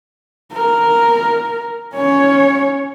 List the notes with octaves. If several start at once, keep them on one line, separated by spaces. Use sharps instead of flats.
A#4
C#4 C#5